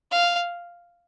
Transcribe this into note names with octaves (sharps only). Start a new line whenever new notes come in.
F5